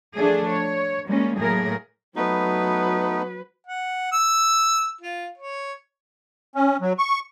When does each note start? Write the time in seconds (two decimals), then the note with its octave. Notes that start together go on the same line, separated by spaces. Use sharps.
0.16 F3 A3 D4 G#4
0.50 C#5
1.07 G3 G#3 A#3 C#4
1.36 A2 F#3 A3 A#3 G#4 A#4
2.16 F#3 A3 B3 D#4 B4
3.67 F#5
4.12 E6
5.01 F4
5.38 C#5
6.55 C#4
6.81 F#3
6.98 C#6